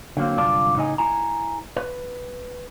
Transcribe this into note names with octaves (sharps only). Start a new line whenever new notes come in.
D3 F#3 A#3 C4
C2 F#2 D3 F4 D5 A5
A2 C#3 D#4 D#5 G#5
E4 G#5 A#5
B4